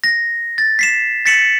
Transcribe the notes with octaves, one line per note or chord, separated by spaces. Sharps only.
A#6
A6
B6 C7 E7
A6 B6 C#7 E7 F#7